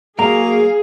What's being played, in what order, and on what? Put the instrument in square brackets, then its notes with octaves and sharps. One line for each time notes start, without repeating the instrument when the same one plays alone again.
[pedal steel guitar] F#3 A#3 A#4 [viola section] G#4 [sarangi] F5 [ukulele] A#5